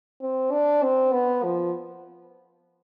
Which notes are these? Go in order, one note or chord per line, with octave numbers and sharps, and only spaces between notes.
C4
D4
C4
B3
F3